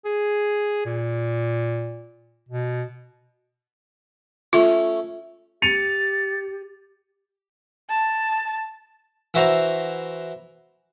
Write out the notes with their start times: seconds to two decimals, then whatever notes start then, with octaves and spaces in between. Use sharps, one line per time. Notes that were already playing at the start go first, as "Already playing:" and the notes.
0.05 G#4
0.85 A#2
2.49 B2
4.53 A3 C#4 F4 C#5
5.62 G4 A6 C#7 D#7 F7
7.89 A5
9.34 E3 E4 F#4 C5 A#5